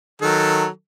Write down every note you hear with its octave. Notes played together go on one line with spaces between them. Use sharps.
D#3 F#3 A4